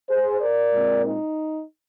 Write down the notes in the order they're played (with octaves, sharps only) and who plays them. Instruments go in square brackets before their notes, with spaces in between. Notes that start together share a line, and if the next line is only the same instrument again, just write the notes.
[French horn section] G#4 C5
A#4 D5
A#2 G#3 C4
D#4